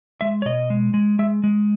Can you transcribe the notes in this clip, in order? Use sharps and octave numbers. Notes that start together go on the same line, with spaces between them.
G#3 E5
C#5
B2 D#5
G#3
G#3
G#3 E5
G#3